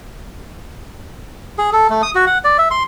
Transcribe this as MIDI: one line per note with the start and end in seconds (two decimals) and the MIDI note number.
1.58 1.70 68
1.73 1.87 69
1.90 2.02 57
2.03 2.11 87
2.15 2.25 66
2.27 2.38 78
2.44 2.57 74
2.58 2.69 76
2.71 2.83 84